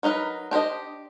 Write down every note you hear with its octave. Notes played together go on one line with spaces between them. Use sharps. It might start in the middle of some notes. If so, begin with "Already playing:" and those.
F#3 D#4 A#4 B4
D4 G4 C5 D#5